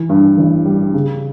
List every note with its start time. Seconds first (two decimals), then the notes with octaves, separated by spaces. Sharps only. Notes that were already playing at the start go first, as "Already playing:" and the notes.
Already playing: E3
0.09 G2
0.37 A1
0.65 G3
0.94 C#3